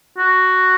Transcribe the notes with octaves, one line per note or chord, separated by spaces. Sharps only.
F#4